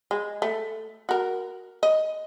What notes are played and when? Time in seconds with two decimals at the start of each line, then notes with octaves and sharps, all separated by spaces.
0.11 G#3
0.42 A3
1.09 F#4 A#4
1.83 D#5